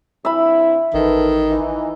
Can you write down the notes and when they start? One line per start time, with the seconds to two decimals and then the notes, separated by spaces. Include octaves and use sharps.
0.25 G2 C4 E4 E5 B5
0.94 A1 D#3 A4 B4
1.48 E3 D#4